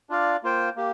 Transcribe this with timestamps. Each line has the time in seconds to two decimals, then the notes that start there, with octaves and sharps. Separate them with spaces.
0.10 D4 F4 D5 F5
0.43 A#3 F4 C5 G5
0.76 A#3 G4